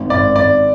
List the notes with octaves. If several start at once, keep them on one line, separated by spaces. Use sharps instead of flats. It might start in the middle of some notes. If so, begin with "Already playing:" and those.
Already playing: G#1
G#1 D5
G#1 D5